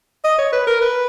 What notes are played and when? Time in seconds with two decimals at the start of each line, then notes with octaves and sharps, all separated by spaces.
0.25 D#5
0.39 C#5
0.53 B4
0.67 A#4
0.81 B4